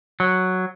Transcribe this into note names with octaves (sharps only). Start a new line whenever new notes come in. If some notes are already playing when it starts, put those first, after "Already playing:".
F#3